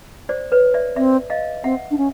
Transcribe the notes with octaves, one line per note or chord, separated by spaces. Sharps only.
C5 D5
B4 C#5
D5 E5
C4 D5 E5
D#5 F5
C4 E5 F#5
D4
C#4